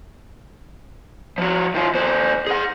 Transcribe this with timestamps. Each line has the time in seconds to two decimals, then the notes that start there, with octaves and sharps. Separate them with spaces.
1.38 F3 F#4
1.74 D#3 F4
1.94 D#2 C5
2.47 G#4 F#5